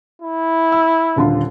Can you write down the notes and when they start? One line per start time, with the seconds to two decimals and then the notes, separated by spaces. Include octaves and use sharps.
0.22 E4
0.72 E6
1.16 D#1 D3 F4